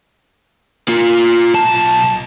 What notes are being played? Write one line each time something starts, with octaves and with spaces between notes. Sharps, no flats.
A#3 F4
B1 A5